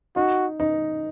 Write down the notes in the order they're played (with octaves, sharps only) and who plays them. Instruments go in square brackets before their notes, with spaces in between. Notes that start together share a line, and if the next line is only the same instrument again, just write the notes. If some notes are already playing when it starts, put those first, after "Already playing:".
[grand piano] D#4 [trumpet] F#4
[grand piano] D#4